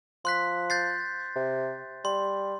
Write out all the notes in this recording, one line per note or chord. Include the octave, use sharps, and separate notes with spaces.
F3 C6 F#6 B6
G6 A6 C7
C3
G3 C6